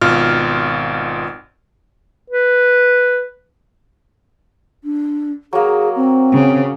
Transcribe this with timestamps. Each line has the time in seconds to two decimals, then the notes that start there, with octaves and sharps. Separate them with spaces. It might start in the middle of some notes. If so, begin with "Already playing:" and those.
0.01 G#1 B2 F4 F6
2.30 B4
4.84 D4
5.53 F#3 A#3 G#4
5.95 C4
6.33 C#3